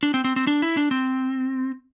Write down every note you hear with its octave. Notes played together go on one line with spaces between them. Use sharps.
D4
C4
C4
C4
D4
E4
D4
C4